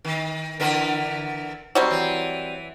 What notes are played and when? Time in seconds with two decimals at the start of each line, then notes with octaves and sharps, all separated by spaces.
0.05 D#3
0.60 D3 E3 A#4
1.75 F#3 G3 C4
1.91 E3